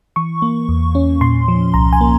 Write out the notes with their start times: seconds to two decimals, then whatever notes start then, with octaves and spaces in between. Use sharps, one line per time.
0.16 E3 C#6
0.42 A#3
0.69 E2
0.95 C#4
1.21 A#2 C6
1.48 F3
1.74 C2 A#5
1.93 G#5
2.01 A#3